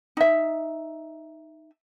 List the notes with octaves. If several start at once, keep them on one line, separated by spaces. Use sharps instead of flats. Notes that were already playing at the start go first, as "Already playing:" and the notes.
D#4 E5